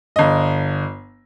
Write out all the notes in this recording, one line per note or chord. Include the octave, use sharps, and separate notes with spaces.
G1 D#5